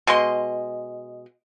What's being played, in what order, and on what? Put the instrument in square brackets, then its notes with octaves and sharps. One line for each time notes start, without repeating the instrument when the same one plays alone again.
[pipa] B2 G#3 D#5 C6